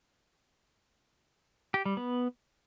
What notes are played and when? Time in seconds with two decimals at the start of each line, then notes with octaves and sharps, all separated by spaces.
1.74 G4
1.86 G3
1.97 B3